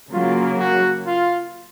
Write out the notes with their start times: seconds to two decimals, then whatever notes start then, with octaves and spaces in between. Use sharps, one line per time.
0.11 C#3 F#3 A#3 F4
0.59 F#4
1.06 F4